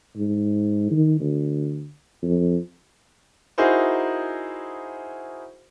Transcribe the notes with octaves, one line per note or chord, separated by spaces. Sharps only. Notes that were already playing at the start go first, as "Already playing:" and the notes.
G#2
D#3
D2
F2
D#4 E4 F#4 G#4 A#4 C5